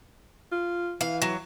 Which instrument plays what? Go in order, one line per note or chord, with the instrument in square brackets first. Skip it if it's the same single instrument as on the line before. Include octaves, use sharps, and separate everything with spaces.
[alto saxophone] F4
[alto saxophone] E3 [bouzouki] F5
[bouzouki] F#3